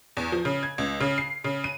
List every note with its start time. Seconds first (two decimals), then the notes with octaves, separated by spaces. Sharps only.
0.17 E2
0.32 F3
0.45 C#3
0.63 G#6
0.78 C#2
1.00 C#3
1.18 C7
1.44 C#3
1.64 D#7